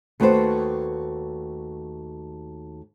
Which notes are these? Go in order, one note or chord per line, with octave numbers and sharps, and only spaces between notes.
D#2 A3 F#4 B4 C5 A5